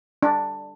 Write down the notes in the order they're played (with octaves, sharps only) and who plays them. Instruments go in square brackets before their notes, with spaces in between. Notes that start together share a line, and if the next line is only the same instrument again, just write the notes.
[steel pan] D4